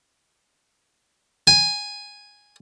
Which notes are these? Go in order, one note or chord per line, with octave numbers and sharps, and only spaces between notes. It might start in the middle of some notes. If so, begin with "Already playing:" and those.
G#5